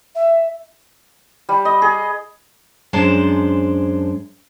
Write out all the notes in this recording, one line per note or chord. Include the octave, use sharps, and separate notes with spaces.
E5
G3
D#5
G#4
F#2 G#3 D4 C5 A5